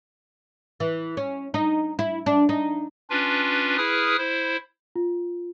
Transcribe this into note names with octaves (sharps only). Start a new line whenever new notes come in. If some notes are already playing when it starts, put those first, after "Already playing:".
E3
C#4
D#4
E4
D4
D#4
C#4 D4 F4 B4
E4 G#4 B4 D#6 F6
E4 C5
F4